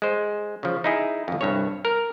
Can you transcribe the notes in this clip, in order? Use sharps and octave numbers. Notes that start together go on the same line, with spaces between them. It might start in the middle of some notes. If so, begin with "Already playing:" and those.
G#3 C5
C#3 F3
D#4 E4 G#4
G1 F2
C2 G2 C#5
A#4